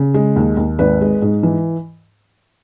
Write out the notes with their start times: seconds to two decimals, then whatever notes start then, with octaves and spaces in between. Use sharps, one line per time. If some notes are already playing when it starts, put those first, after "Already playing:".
Already playing: C#3
0.14 G#3
0.36 D#2
0.57 D#2
0.79 G#1 B4
1.01 G#3
1.22 G#2
1.43 E3